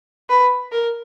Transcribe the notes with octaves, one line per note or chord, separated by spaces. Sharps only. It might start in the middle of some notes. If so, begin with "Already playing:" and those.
B4
A#4